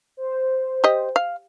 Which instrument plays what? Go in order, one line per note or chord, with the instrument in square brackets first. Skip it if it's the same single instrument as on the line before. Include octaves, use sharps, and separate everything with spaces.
[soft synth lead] C5
[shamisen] G4 D#5
F5